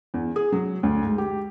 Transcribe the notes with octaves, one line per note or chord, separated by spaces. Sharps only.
E2
G#4
F#3
D2
G#2
G4